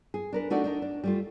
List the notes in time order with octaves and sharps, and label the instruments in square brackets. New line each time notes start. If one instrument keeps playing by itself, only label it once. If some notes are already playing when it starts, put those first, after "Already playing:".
[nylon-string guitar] G#4
D4 A#4 B4
A3 D4 D#4 F#4 A4 D5
D4 D#4 A#4
D4
G3 A3 F4